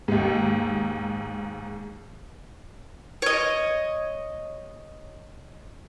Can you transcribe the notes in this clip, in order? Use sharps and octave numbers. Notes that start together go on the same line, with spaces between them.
D#2 G#2
C#5 D#5